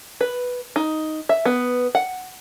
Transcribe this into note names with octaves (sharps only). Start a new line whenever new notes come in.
B4
D#4
E5
B3
F#5